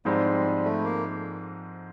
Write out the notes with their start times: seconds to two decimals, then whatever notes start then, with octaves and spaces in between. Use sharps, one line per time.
0.05 G#2 F3 G3 G#3 C4 D#4
0.64 A3
0.84 A#3